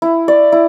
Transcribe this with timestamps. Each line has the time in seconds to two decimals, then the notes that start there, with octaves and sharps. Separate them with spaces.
0.02 E4
0.28 D5
0.52 E4